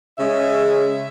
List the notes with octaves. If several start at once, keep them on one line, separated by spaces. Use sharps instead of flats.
C#3 G#3 C#4 E5